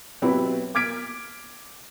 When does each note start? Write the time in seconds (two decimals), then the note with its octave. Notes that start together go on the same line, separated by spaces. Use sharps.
0.22 B2 F#3 C4 E4 G4 B4
0.75 D6 F6 G#6 B6 D7